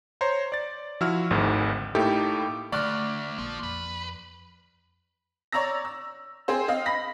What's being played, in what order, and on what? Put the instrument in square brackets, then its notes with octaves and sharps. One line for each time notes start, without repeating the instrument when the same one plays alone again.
[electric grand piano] C5 C#5 A#5 C6
D5 A6
F3 E4 F#4 E6 F6
G#1 D2 G#2 D#3
A2 A#3 D#4 E4 G4 A4
[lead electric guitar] D2 [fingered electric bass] D3 A3 [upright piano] D5 [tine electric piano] C#6 F6 F#6
[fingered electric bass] A#1 A#3 [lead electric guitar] F3
[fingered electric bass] F2 [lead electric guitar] B4
[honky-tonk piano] C#5 D5 A#5 E6 A#6
E6
C4 G#4 C5
C4 D#5 F5
B5 A#6 B6